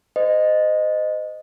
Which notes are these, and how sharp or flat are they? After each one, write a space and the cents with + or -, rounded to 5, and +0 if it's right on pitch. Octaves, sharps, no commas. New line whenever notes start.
C5 -35 D#5 -10